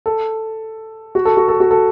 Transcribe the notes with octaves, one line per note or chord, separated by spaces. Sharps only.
A4
F#4
A4
F#4
A4
F#4
A4